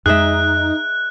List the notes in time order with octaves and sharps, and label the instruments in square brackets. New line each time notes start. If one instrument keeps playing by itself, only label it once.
[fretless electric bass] F2 G#3 [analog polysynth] D#4 [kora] G#4 D#5 E5 [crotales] F#6